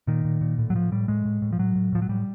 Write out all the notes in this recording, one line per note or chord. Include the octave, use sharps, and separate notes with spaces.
A#2 D#3
A#2
A#2
A2
F#3
A2 F3
A2 G3
A2 G#3
A2
A2
F3
A2 F#3
A2
A2 F3
F#3
A2 G3